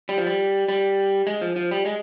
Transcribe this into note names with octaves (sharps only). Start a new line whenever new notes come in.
G3
F3
G3
G3
G#3
F3
F3
G3
G#3